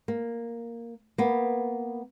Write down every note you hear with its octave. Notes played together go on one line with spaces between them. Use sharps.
A#3
A#3 B3